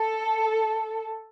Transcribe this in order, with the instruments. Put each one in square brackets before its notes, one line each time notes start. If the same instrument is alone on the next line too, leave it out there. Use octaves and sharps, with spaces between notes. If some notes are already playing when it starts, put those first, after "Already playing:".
Already playing: [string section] A4